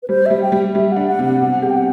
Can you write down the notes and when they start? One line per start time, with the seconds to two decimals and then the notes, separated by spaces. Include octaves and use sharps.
0.03 B4
0.08 G3 C5
0.26 G3 E5
0.42 G5
0.52 G3
0.74 G3 E5
0.92 D4 F#5
1.08 F#5
1.19 C3 F#5
1.41 B2 F#5
1.62 G4 F#5
1.70 G5
1.77 F#5